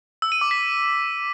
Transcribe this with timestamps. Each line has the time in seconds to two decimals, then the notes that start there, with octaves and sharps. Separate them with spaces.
0.22 E6
0.32 D#7
0.41 D6
0.51 B6